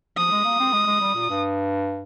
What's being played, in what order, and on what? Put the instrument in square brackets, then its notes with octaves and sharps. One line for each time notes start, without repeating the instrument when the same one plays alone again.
[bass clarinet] F3 [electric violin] D#6
[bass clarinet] G#3
A#3
C4
G#3
G#3
G3
A#2
G2